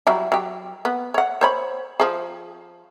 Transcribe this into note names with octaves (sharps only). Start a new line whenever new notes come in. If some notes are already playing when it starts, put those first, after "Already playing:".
F#3 G3 E4
F#3 G4
B3
C#5 F#5
C5 C#5 B5
F3 G#4